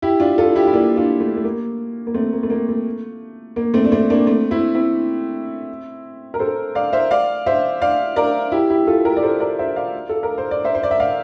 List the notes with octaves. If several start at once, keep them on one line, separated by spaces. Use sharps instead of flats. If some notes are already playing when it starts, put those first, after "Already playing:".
E4 G4
D4 F4
F4 A4
E4 G4
E4
A#3 D4
D4 F4
A3
A3
A#3
A#3
A3 C4
A#3
A3
A#3
A3
A#3
A3 C4
D4
A3 C4
A#3 D4
A3 C4
C4 E4
C4 E4
A#4
A4 C5
D5 F5
C5 E5
D5 F5
C5 E5
D5 F5
A#4 D5
E4 G4
E4 G4
F4 A4
G4 A#4
D5
A4 C5
A#4 D5
C5 E5
D5 F5
A4
A#4
C5
D5
C5 E5
C5
D5
E5
D5 F5